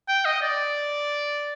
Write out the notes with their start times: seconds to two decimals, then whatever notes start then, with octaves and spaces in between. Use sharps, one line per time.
0.08 G5
0.25 D#5
0.42 D5